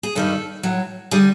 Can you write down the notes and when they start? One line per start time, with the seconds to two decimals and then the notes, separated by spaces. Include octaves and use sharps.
0.03 G#4
0.15 G2 D#3 G3 A4
0.63 A2 F#3
1.11 D3 G3 G#4